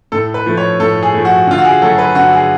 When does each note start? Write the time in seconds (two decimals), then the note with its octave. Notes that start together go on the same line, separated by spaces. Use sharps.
0.12 A2 A4
0.34 B4
0.46 F3 A3
0.57 C#5
0.80 A2 A4
1.03 G#4
1.14 F3 A3
1.25 F#4
1.47 D3 F4
1.58 F#4
1.65 G#4
1.82 F#3 A3 A4
1.98 B4
2.15 D3 F#4
2.33 G#4